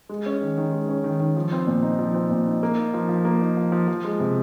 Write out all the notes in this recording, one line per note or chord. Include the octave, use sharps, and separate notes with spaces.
G#3
C#4
D#3
D#3
G#3
C#4
D#3
D#3
F3
C4
A#2
D#4
F3
C4
A#2
D#4
A#3
D#4
F3
F3
A#3
D#4
F3
F3
F3
G#3
C3